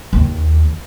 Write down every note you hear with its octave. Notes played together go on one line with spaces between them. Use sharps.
D#2